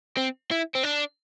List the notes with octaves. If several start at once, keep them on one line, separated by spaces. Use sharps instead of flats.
C4
E4
C4
D4